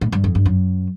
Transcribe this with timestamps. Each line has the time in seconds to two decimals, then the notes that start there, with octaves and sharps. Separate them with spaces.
0.01 A2
0.12 G2
0.24 F2
0.35 G2
0.46 F#2